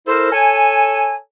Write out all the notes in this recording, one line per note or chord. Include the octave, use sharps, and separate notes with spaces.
E4 A4 A#4 C5
A4 C#5 G#5